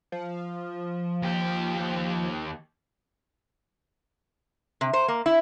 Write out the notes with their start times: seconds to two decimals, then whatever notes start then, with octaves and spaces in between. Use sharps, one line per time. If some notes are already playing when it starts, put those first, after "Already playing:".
0.12 F3
1.23 D#2 G4
4.81 C3
4.93 C5
5.08 A#3
5.26 E4